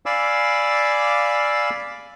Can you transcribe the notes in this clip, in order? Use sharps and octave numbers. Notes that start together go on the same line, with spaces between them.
D5 F5 G#5 B5 D6 E6